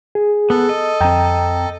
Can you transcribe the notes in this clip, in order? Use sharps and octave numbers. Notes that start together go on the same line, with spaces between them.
G#4
B3 A4
D#5
F2 C4 G5 A#5